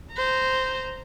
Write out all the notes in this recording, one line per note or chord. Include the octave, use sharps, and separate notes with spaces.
C5 A#5